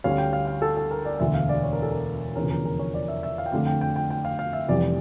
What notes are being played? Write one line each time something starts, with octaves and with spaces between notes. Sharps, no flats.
D2 D3 G3 C#4 F5
G5
F5
F5
A4
A4
A#4
D5
E1 D2 D3 E5
F5
D5
C#5
A#4
A4
A#4
F1 E2 D3 F3 C#4 A#4
A#4
A#4
C#5
D5
E5
E5
F5
G5
F2 D3 A3 D4 F5
G5
G5
G5
G5
F5
F5
E5
F1 F2 E3 G3 D5